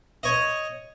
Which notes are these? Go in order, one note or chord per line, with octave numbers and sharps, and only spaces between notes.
C#5 D#5